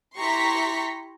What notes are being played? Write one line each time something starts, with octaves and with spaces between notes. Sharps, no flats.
E4 G4 A#5 C6 C#6 B6